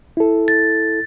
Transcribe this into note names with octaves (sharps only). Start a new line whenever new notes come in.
E4 A4
A6